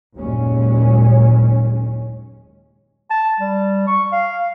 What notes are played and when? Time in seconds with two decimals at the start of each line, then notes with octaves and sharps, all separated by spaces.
0.15 F#1 D#2 A#2 G#3 C#4
3.10 A5
3.40 G3
3.87 C#6
4.12 F5